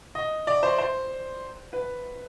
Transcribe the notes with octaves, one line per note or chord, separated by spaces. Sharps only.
D#5
D5
C5
C5
B4